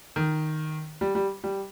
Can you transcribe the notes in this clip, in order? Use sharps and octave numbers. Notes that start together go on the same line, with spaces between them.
D#3
G3
G3
G3